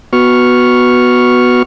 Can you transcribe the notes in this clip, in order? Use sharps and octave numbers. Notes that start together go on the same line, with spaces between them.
B3 F#4 C#6 F6